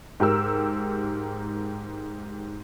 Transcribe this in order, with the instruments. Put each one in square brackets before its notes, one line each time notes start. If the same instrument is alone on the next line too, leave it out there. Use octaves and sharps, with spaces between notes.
[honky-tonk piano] G#2 G4 A#4 E6